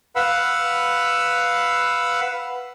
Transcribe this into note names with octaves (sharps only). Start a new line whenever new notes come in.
B4 F5 F#5 B5 E6